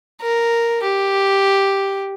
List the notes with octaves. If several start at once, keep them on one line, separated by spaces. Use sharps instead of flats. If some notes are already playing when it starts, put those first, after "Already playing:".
A#4
G4